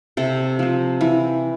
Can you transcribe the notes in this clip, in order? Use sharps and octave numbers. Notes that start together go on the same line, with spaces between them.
C3 A4
F3 C4
E3